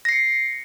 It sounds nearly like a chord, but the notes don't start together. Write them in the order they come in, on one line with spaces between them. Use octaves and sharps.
A#6 C7 C#7